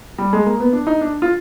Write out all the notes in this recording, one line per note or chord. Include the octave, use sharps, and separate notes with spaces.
G3
G#3
A#3
B3
D4
D#4
D4
F4